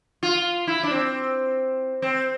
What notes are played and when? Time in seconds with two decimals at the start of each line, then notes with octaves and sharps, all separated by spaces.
0.23 F4
0.67 E4
0.83 D4
0.91 C4
2.02 C4